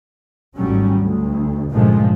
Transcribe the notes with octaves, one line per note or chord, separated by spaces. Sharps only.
G#1 A2 F#3 G3 C#4
D2
C#2 G2 A#2 F3 G#3 A3